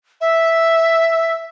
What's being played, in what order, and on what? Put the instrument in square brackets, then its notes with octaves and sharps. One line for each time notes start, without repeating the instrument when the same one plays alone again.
[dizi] E5